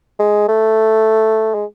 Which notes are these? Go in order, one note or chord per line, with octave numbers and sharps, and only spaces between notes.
G#3
A3
G#3